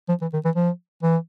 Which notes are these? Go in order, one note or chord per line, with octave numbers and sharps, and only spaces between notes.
F3
E3
D#3
E3
F3
E3